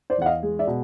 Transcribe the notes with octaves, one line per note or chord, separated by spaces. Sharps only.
C5 D5
E2 F#5
D#5 F5
G#3
D5 E5
B2